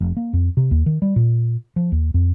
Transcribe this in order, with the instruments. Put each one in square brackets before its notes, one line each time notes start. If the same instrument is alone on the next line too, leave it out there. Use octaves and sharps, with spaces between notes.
[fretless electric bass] F1
A#3
F2
C3
D#2
D#3
G3
A#2
F3
D#2
F2